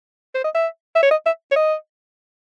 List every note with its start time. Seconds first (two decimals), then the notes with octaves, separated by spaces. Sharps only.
0.35 C5
0.44 D#5
0.55 E5
0.95 E5
1.03 C#5
1.11 D#5
1.26 E5
1.51 C#5
1.56 D#5